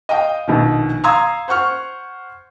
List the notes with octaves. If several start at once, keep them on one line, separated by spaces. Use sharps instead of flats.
D#5 F5 G5
A#1 B2 D#3
F5 A#5 C6 D#6 E6 G#6
C5 F#5 C#6 F6